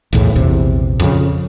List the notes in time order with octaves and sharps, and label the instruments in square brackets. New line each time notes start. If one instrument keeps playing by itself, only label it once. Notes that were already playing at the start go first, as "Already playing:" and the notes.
[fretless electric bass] B1 E2 A2
A#1 E2 C3
F2 C#3